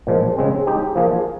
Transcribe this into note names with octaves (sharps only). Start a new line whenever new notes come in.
A#2 F3 G#3
C#3 G#3 C4
G#3 D#4 G4
F3 A#3 F4 G#4